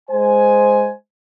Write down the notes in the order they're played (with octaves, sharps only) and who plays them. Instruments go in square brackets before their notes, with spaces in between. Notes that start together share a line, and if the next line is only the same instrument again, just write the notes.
[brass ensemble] G#3 C5 G#5